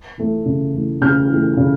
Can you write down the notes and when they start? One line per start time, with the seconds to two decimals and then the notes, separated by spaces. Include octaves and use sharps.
0.18 E3 A3
0.46 C#3
0.74 E3 A3
1.01 C#3 F6 G6
1.29 E3 A3
1.57 C#3